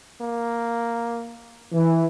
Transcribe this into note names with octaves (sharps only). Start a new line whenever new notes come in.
A#3
E3